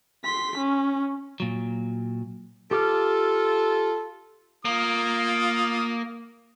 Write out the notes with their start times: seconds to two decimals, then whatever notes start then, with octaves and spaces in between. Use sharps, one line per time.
0.25 C6 B6
0.58 C#4
1.40 A#2 F#3
2.71 F4 G4 A4 D6 F6
4.65 A#3 F4 D#6